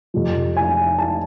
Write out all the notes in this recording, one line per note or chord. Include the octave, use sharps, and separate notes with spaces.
F2 C3 F3
G#5
A5